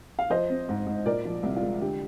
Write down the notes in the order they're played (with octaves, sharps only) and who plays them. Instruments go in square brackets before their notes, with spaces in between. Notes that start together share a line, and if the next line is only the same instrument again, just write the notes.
[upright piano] F5
F3 C5 D#5
C4
G#2
G#2
A#2 A#4 D5
F3
C2
F4
G#3
D3 G4